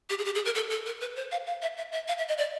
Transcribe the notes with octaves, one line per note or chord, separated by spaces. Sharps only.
G4
G#4
G4
G#4
A#4
A4
A4
A#4
B4
C5
F5
F5
E5
E5
E5
F5
E5
D#5
D5